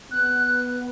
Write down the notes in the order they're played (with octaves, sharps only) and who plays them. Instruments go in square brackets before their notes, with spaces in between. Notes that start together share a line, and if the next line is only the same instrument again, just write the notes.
[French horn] B3 [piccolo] F#6